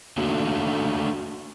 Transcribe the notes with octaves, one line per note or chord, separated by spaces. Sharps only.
A3 A#3 D4 F#4